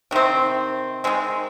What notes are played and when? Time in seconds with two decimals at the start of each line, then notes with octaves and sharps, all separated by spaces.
0.11 C3 D#3 C4
1.04 D#3 G#3 C4